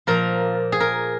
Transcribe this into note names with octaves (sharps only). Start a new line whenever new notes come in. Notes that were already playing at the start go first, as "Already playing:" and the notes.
A#2 F3 A#4
G#4
A#4